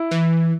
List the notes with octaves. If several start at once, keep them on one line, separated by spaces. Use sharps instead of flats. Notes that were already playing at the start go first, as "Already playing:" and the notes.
Already playing: E4
E3